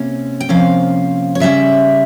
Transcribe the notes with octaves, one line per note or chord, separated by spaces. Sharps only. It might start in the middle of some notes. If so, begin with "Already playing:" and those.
Already playing: C3 A#3 C#4
G5
C3 F3 A#3 C#4 F5
C#5
C#3 G3 C#4 E5